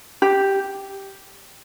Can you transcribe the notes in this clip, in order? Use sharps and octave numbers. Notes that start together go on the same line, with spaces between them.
G4